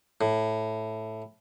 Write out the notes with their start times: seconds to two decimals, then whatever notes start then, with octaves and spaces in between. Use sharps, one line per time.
0.21 A2